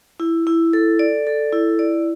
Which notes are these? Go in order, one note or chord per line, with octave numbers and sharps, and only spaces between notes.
E4
E4
A4
D5
A4
E4
D5